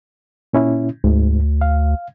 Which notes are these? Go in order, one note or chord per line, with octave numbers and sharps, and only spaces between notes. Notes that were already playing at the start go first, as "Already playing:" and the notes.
A#2 C#4 E4
D2 G#2
F5